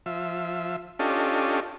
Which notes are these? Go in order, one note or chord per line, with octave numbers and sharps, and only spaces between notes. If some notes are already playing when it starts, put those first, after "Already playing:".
F3 E5
C#4 D4 F4 G4 A4 D#5